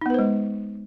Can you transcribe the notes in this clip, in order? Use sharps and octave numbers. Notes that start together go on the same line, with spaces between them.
G#3 B3 D#4 B4 C5